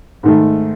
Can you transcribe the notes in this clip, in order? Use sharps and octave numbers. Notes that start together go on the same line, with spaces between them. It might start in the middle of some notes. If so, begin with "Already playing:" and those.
G#2 D#3 A3